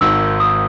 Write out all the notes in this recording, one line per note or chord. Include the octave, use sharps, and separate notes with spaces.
G#1 G#2 D#3 E6
D#6